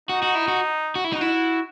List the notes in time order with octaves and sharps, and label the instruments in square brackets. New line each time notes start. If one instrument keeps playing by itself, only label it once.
[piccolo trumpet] D#4 [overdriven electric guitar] F#4
[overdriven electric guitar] F#4
E4
F#4
F#4
E4
[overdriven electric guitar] D#4 [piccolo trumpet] F#4
[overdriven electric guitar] E4